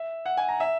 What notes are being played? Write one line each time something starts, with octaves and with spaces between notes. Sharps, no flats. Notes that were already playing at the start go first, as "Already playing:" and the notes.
Already playing: E5
F#5
G#5
A#5
E5